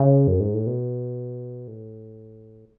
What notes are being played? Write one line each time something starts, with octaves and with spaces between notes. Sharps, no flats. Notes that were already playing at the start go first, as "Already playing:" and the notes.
Already playing: C#3
F#2
G#2
A2
B2
A2